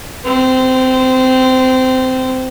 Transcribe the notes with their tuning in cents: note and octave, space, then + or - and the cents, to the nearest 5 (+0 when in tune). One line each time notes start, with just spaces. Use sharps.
C4 -20